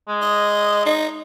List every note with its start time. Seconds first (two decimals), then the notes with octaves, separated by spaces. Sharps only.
0.08 G#3
0.22 D#5
0.85 D#4